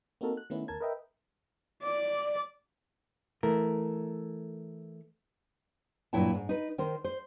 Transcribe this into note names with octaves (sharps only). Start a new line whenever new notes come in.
A#3 C4 D#4 F#4 A4 A#4
F#6
D#3 A3 B3 C#4 D#4 E4
D2 A#4 A5 G#6
A#4 B4 D#5 E5 G5
D5
E3 A3 A#4
G2 A#2 F#3 E4 G5 A5
G#2
D#4 B4
D#3 A#4 C5
C5